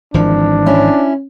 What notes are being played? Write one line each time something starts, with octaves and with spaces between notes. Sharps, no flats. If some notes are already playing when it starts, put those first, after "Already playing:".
G#1 E3 F3 D4
C#4 E4